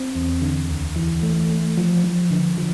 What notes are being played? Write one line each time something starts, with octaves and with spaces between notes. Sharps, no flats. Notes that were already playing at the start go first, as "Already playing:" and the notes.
Already playing: C4
E2
D3
D2
E3
A3
A3
F3
F3
D3
F3